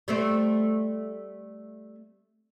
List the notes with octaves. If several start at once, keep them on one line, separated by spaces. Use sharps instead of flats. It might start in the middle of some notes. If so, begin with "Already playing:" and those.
G3 A3 C4